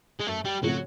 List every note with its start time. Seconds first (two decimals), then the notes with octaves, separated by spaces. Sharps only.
0.20 G#3
0.27 F#2 A3
0.45 G3
0.62 C#3 F3 F#3 A3 C4